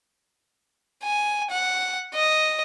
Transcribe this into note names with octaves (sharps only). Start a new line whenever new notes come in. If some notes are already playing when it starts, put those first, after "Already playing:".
G#5
F#5
D#5